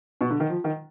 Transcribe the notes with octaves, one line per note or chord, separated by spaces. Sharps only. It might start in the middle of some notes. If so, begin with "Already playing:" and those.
B2
D3
D#3
F3
D#3